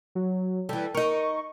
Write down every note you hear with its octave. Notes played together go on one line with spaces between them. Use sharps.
F#3
E3 G3 A4
D#4 A#4 C#6